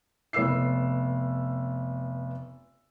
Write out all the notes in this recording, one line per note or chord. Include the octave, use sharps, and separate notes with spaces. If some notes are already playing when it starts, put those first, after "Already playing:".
F1 B3 C#5 E6 C7